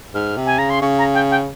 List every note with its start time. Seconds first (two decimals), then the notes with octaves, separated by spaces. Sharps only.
0.14 G#2 F6
0.37 C3
0.46 G#5
0.58 C#3 A#5
0.70 C6
0.81 C#3 C#6
0.98 A#5
1.14 G5
1.31 G5